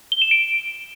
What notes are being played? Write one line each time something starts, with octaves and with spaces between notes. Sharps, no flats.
G7
E7
D7